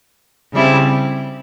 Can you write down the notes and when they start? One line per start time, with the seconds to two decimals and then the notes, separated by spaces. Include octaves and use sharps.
0.52 C#3 G3 C4 E4